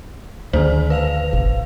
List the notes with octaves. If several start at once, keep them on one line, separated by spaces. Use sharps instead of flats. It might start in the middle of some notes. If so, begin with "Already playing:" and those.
D2 D#3 C5
B4 F5 F7
A1